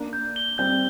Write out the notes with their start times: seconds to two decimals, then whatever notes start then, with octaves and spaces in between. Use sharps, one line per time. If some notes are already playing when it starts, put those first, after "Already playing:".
Already playing: A#3 D4
0.13 G6
0.36 G7
0.58 G3 C4 G6